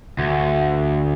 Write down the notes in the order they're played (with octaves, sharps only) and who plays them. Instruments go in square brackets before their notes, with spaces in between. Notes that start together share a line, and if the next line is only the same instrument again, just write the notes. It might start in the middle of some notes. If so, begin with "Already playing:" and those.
[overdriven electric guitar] D2